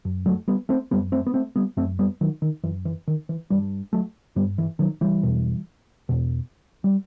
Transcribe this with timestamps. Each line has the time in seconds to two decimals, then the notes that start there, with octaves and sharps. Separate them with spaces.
0.05 F#2
0.26 F#3 A3
0.48 G3 B3
0.69 A3 C4
0.91 F#2 G3 B3
1.12 A3 C4
1.27 B3
1.34 A3 C4
1.56 G3 B3
1.77 F#2 A3 C4
1.99 G3 B3
2.21 D#3 F#3
2.42 D#3
2.63 F#2 E3
2.85 E3
3.08 D#3
3.29 E3
3.50 G2 E3 G3
3.93 F#3 A3
4.36 G2 G3 B3
4.58 E3
4.79 D#3 F#3
5.01 E3 G3
5.23 E2 B2
6.09 E2 B2
6.84 G3